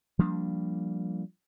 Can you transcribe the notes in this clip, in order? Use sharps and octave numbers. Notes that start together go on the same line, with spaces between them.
F3 G3 A#3 D4